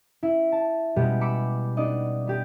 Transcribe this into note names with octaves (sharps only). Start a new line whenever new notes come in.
E4
A5
B2 G3 G#3 B3 G4
B5 D6 E6 C#7
B3 D4 D#4 D5 D#5
B3 G4 G#4